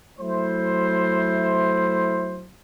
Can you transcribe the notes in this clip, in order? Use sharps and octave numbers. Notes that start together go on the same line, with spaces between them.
F#3 A3 E4 C5